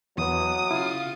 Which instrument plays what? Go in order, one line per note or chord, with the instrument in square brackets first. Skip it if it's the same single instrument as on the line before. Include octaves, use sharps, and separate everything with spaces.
[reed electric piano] E2 B3 [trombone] F#3 [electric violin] D#6
[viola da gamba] C#3 F4 [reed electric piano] E4